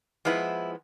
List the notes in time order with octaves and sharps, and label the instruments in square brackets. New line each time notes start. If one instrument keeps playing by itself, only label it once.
[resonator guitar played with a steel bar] F3 G#3 B3 E4